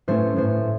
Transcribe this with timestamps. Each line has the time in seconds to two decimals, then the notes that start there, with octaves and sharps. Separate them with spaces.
0.08 A2 A3 C#4 C5
0.36 A2 A3 C#4 C5